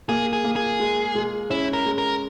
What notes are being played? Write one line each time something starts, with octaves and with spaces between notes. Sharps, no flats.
A#3 G#4
G#4
A#3
G#4
G#3
G#3
C#4 E4
A#4
G#3
A#4